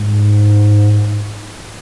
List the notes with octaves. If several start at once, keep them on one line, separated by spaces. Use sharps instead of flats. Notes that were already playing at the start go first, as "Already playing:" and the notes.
Already playing: G#2